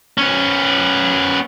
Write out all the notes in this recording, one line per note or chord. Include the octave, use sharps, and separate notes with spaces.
B3 C#4